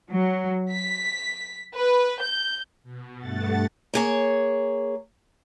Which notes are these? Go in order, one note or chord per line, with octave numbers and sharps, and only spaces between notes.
F#3
B6
B4
G6
B2
G2 A3 F#5 A6
A#3 G#4 C#5